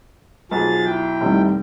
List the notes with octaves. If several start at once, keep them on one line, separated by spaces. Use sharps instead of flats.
B1 F3 G#4 A6
E4 G5
F1 D#3 G3